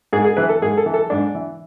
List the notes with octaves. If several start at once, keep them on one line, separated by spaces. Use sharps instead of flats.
G#2 G#4
G#4
E3 B4
A4
G#2 G#4
A4
E3
A4
G#2 D4
E3